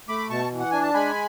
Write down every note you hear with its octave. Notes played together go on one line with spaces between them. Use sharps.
A3 B5 D6
B2 A5 C#6
E3
F#5
D4 G#5
A5
G#3 G#5 B5